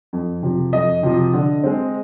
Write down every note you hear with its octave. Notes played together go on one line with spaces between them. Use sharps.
F2
C3 F3
F2 D#5
C3 F3
D3
G#3 C4